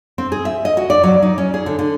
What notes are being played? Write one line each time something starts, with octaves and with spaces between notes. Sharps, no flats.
C4
G#4
E5
D#5
F#4
D5
F#3
D#4
C#4
G#4
D3
D3